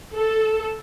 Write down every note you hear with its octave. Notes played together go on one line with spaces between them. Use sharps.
A4